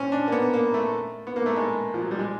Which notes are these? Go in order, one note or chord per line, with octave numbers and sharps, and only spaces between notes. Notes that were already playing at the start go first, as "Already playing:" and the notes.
Already playing: C4 C#4
D4
A#3
B3
A#3
A3
B3
A#3
A3
G#3
F3
F#3
G3
G#3